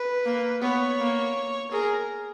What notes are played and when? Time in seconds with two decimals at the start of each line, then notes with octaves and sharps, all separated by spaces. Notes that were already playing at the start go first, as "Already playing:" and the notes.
Already playing: B4
0.26 A#3
0.62 B3 C#5
0.99 A#3
1.72 G#4 A#4